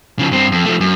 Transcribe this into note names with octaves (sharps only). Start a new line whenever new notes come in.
C#3 F3
G2 C4
F2
F3 A3
F#2